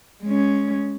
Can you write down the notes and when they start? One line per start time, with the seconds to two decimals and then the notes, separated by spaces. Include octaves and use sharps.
0.23 G#3 C#4